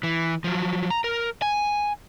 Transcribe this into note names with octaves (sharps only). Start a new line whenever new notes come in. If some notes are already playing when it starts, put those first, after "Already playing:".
E3
F3 F#3
A#5
A#4
G#5